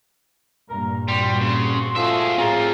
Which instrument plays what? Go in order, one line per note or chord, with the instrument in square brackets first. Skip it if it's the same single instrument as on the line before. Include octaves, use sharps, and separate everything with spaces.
[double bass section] G2 A#2 [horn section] A#4 A#5
[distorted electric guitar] G3 [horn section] C4 F#4 C6
[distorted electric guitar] C#3
[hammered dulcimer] F3 F4 [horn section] A3 F#4 [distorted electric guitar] G#4 E5
[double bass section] A2 [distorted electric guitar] C4 F4 [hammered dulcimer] G#4 [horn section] A#4 A#5